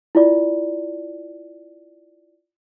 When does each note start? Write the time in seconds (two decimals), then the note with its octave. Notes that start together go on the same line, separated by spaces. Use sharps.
0.15 E4 F4 D5